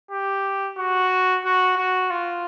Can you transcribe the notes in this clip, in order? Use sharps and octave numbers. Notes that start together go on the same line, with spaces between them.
G4
F#4
F#4
F#4
F4